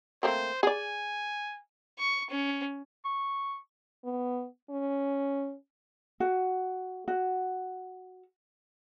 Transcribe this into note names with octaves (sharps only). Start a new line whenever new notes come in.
A3 A#3 C4 C5
G#4 D5 G#5
C#6
C#4
C#6
B3
C#4
F#4
F#4